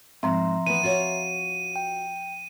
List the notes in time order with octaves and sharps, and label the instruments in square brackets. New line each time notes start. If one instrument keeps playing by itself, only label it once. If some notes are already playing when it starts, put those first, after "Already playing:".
[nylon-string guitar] G#2 [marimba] F3 C4 [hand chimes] E5 A#5 C6
[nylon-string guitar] E3 B3 [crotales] D#7
[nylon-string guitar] F4 F#4 C#5
[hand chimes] G5